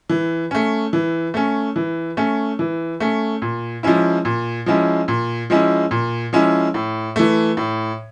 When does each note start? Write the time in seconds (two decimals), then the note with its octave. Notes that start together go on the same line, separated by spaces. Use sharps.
0.10 E3
0.51 A3 C#4
0.93 E3
1.34 A3 C#4
1.76 E3
2.17 A3 C#4
2.59 E3
3.00 A3 C#4
3.42 A#2
3.83 F3 G#3 C#4 E4
4.25 A#2
4.66 F3 G#3 C#4 E4
5.08 A#2
5.50 F3 G#3 C#4 E4
5.91 A#2
6.33 F3 G#3 C#4 E4
6.74 A2
7.16 E3 A3
7.57 A2